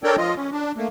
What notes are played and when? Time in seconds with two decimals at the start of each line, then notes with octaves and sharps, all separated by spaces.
0.04 D4 A4 A#4 C#5 D5 G5
0.18 F3 F4 D#5
0.37 C#4
0.52 D4
0.77 A3 A#3